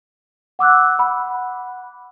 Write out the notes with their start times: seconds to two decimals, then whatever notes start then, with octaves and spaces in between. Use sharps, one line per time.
0.59 F#5 D6 E6 F#6
0.99 F#5 B5